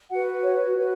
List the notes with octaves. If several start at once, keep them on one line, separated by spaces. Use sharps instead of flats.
F#4 B4 F#5
C#5
F#4 B4